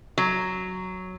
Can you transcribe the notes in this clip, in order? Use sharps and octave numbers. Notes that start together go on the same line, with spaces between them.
F#3